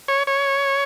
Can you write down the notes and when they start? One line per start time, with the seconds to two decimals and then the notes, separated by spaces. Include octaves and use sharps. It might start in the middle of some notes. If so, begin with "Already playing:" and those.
0.08 C#5
0.27 C#5